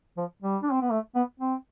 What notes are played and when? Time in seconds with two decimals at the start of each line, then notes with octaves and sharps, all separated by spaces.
0.18 F3
0.42 G3
0.63 D4
0.72 C4
0.82 B3
0.91 A3
1.15 B3
1.40 C4